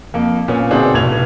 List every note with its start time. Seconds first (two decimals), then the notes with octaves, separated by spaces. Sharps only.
0.14 F2 A#3
0.48 A#2 B3 C#4
0.71 B2 D3 C4 D4 D#4 G#4
0.93 F1 B1 A2 G#6 F7